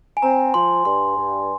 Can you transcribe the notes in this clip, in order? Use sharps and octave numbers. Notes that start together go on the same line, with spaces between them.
G#5
C4 A#5
F3 C6
G2 C6
G2